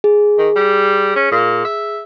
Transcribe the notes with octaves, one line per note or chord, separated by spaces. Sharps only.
G#4
D#3
G3
C#4
A#2
E5